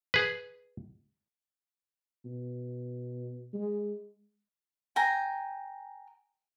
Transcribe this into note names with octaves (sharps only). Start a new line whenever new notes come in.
G#4 B4
B2
G#3
G5 G#5 A#5